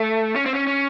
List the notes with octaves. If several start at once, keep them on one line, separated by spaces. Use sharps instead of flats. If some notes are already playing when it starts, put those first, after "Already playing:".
Already playing: A3
C#4
C4
C#4
C#4